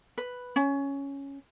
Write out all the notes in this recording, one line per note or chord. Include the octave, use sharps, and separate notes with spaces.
B4
C#4